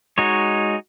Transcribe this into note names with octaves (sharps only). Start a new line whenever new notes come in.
G#3 D#4 F#4 C#5